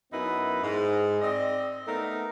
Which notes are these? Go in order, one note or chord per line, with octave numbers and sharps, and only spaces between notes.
F#2 B3 D#4 E4 B4
G#2
C4 D5 D#5
A3 B3 D#4 A#4